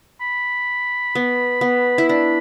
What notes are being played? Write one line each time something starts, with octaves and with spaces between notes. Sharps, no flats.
B5
B3
B3
E4
D4 B5